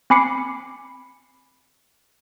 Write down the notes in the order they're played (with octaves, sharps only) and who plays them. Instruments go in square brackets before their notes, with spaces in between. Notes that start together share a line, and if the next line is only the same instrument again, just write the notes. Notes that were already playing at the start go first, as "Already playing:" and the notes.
[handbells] C4 G#5 B5 D6 C7 C#7